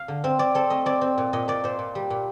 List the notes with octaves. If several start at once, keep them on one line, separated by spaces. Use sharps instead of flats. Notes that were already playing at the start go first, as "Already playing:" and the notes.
Already playing: F5
D3
C4
C4 D5
C4 A4
A3 D#5
C4 D5
C4
A#2
A#2 D#5
A#2 D5
A#2 C5
A#2
G3
A#2